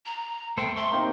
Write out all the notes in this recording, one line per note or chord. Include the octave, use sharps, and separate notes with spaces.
A#5
A3 A4 C5 G5
E5 C6 C#6
C3 D#3 A#3 A#5 G6